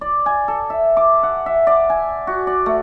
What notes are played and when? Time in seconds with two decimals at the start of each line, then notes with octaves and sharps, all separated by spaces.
0.01 D5
0.26 G#5
0.48 A4
0.70 E5
0.97 D6
1.23 F#5
1.46 E5
1.67 D5
1.90 G#5
2.27 F#4
2.47 D5
2.66 A3